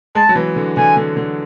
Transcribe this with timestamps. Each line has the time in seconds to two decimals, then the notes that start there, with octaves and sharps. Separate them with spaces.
0.15 G#3 A5
0.29 F#3
0.36 E3
0.56 D3
0.77 D3 G#5
0.97 D3
1.17 D3